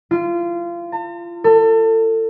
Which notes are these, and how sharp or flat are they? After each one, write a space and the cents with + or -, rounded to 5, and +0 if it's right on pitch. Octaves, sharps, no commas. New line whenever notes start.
F4 -25
A5 +45
A4 +30